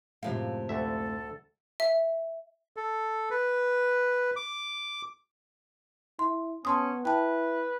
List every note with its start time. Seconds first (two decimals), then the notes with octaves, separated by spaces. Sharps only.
0.23 F#2 A2 C3 F3 G#3 F5
0.69 D2 A4 E5
1.80 E5
2.77 A4
3.30 B4
4.36 D6
6.19 E4 C6
6.65 B3 C#4 A5 C6 D#6
7.05 E4 B4 G5 A5